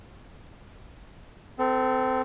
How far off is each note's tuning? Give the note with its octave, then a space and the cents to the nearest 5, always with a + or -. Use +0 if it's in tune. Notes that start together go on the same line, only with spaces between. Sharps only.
C4 -25 A4 +0